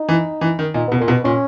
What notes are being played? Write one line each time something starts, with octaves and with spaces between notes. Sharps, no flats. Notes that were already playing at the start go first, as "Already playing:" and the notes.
Already playing: D#4
E3
E3
D#3
A#2 D#4
B2 B3
A#2 A#3
B2
B3
A#2 C#4